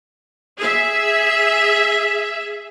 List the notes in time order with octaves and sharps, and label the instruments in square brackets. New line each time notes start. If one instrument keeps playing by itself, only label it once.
[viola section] G#4 E5